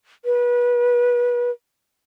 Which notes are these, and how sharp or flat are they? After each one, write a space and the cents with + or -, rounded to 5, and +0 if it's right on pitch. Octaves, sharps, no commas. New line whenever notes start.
B4 -30